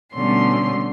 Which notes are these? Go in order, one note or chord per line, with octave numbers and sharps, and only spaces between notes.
B2 D3 G3 A3 C#4 C6